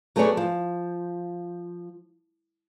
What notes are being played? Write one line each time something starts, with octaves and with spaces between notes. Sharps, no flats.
F#3 A3 B3 G#4 C#5 D5
F3